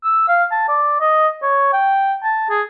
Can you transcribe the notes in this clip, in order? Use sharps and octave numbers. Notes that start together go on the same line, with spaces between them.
E6
F5
A5
D5
D#5
C#5
G5
A5
G#4